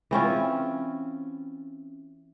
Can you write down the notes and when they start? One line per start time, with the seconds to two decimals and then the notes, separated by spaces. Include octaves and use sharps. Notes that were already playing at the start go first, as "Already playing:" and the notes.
0.11 E3 C4 C#4 F4